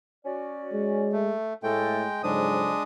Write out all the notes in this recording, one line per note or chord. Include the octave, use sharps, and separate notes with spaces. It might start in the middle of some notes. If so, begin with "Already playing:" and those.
C#4 F#4 D5
G#3
A3
A2 G#3 A3 A4 G5
F2 G#2 C#3 F#3 G#3 D4 D#6